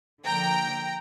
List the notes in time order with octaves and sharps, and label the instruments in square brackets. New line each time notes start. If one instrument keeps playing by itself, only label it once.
[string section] D3 F3 A#3 G5 A#5